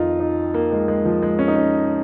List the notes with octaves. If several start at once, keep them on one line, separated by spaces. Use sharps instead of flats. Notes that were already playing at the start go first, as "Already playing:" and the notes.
Already playing: F2 D#3 D#4 F4
D#4
A#3
G#3
G#3
F3
G#3
C#4
D#4
C#4